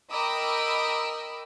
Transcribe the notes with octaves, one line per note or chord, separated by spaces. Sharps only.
A#4 D#5 G5 B5 D6 E6